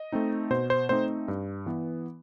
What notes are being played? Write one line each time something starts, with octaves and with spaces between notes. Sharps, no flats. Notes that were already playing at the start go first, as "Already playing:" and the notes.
Already playing: D#5
A3 C4 D#4
B2 C5
C5
A3 C4 D#4 C5
G2
E3 B3